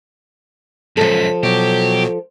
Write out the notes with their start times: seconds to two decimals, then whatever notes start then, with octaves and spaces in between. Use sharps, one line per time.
0.97 C#2 F#2 F3 A4 B6
1.43 B2 F#3 G4